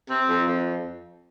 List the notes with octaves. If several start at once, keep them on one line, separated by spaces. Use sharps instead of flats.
C4
F2
F2